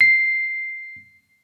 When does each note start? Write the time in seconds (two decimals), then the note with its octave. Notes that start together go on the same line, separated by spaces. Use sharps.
0.01 C7